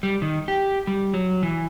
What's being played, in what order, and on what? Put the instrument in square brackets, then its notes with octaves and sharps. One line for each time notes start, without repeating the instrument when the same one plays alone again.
[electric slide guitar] G3
D#3
G4
G3
F#3
E3